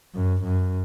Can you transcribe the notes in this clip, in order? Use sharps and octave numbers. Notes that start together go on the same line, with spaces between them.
F#2
F#2